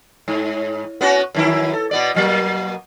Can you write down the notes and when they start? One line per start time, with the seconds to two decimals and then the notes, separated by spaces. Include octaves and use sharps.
0.28 G#2
1.01 B3 C#4 F#4
1.35 F#2 D#3 E4
1.73 A4
1.91 B2 B3 D5
2.15 B2 F#3 A#3